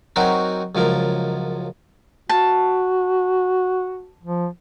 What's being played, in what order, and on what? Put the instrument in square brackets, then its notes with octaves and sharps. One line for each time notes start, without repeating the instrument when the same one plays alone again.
[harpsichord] F#3 C4 D#4 F#4 A#4
C#2 F#2 F3 A#4
[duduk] F#4 [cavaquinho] A5
[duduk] F3